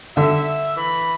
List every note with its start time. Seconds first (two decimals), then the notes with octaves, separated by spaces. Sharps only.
0.17 D3 E5
0.77 E3 B5